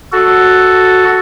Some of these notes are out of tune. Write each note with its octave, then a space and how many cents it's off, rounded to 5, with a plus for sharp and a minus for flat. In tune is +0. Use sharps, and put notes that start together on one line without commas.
F#4 +0 A4 +0